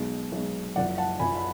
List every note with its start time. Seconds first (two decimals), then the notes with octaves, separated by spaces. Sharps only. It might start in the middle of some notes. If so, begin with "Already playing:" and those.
Already playing: B1 B2 G#3
0.32 B1 B2 G#3
0.76 F#1 F#2 F3 D5 F#5
0.98 F#5 A5
1.19 F#1 F#2 F3 G#5 B5
1.37 B5